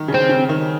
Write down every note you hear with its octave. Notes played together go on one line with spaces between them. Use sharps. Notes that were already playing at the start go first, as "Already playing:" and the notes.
Already playing: D#3
C#3
C4
C#3
D#3